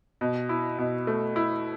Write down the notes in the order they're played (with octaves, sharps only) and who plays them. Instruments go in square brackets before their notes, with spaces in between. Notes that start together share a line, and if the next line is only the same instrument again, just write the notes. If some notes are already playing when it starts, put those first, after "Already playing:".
[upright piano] B2
E4
B2
A3
E4